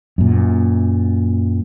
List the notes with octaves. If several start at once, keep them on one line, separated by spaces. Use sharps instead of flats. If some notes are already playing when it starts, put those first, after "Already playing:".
F#2 A#2